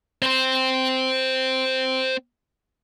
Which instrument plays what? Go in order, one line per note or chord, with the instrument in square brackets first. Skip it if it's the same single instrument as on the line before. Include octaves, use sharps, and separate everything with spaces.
[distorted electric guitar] C4 C5